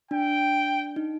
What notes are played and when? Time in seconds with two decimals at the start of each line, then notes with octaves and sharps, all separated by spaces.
0.11 D4 G5
0.96 D#4